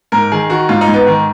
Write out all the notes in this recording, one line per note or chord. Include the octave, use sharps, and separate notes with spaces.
G#2 A#4
D#3 G#4
D#3 F#4
G#2 F4
D#4
G#2
B3
D#3